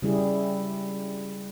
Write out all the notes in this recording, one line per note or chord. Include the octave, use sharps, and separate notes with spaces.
C#3 G3 E4 G#4